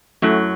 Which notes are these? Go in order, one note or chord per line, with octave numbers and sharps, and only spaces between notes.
F#2 F#3 A3 C#4 E4 A4